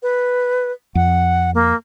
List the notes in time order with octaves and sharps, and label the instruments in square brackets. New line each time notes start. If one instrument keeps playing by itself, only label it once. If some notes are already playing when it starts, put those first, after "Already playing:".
[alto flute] B4
[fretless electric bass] F2 [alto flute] F#5
[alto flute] A#3